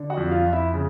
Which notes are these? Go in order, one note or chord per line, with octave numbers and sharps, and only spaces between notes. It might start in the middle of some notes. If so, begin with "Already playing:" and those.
Already playing: D3
F#4 F#5
F2
F4 F5
F2
E4 E5
C#3